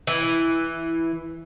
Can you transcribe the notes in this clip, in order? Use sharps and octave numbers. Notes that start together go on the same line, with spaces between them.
E3